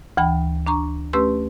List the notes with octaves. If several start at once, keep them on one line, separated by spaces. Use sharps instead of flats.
D2 E3 G5 B5
D4 A#5 C#6
A3 C#4 G4 B4 C6 E6